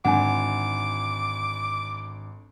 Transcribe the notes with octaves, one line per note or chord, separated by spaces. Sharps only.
G#1 D3 F#5 G#5 D6